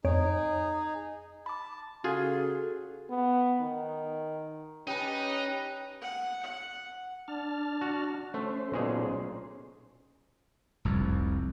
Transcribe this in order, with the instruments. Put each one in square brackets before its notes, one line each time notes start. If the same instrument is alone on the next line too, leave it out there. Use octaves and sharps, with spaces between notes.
[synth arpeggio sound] F2 C#5 D7 [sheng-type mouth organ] D#4 G#4
[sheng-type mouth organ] A5 [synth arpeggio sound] B5 D6
[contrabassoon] C#3 [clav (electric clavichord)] F4 G#4 [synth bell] F#4 [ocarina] A4
[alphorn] B3
D#3
[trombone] C#4 [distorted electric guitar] D#4 [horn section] G4 B4 [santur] G5 A5
[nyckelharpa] F#5
F#5
[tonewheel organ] D4 A5 F6
[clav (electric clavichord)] F#4
[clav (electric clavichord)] A3 [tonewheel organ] C#4 C5
[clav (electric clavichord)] B1 A#2 G#4
[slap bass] F1 C2 F2